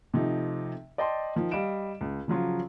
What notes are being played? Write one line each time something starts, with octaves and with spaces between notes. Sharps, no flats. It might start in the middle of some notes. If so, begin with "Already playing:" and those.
C3 F3 A3 D#4
D5 D#5 G5 A5 C6
D#3 F3
G3 D#5 F5 D7 E7
C#2
C#3 F3 F#3 F4